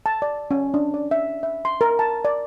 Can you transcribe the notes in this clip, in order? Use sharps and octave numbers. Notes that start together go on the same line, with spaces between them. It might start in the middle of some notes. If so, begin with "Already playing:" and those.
A5
D5
C#4
D4
D5
E5
E5
C6
A#4
A5
D5